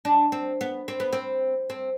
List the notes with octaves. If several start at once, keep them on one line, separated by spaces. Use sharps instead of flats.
D4
C4
B3
C4
B3
C4
C4